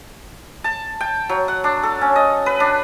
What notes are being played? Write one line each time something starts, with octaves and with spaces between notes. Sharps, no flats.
A5
G5
F#3
F#5
D4
A4
C#4
D#5
B4
D4